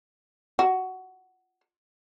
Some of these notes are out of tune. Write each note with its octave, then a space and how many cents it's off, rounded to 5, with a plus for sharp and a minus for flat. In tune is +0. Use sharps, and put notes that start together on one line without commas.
F#4 +10